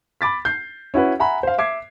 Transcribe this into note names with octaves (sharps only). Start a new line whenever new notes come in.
B5 D6 A6 B6
G6 C7
C#4 E4 F#4 B4
E5 F#5 G#5 A#5 B5
C5 F5
E5 D6 G#6 C7